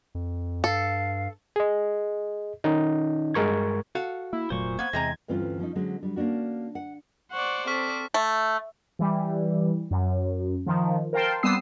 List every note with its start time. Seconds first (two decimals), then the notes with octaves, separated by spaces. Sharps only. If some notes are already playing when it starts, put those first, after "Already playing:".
0.15 F2
0.64 G2 A4 F5
1.56 G#4 D#5
2.64 D#3 C#4 D#4
3.34 G2 G#3 A#4 C#6 G#6
3.95 F#4 A4 F5
4.33 A#3 E4
4.50 F1 A#2 F#3 A3 C5 C#6
4.79 A#3 B3 G#6
4.93 E2 C3 G#3 D#5 A#5
5.28 D2 G2 E3 C4 C#4 F4
5.59 F3 C#4 D#4
5.75 D3 F#3 G#3 C4 C#4
6.03 F#3 G3
6.16 A#3 C#4 D4 F#4
6.75 F#5
7.32 C5 D5 F#5 C#6
7.67 C4 A4 C#6 F6 B6
8.14 A3
8.99 E3 G3
9.91 F#2
10.66 D#3 F3
11.13 A#4 C5 F5 G5 A5 C6
11.43 G3 B3 C4 D#6 E6 C7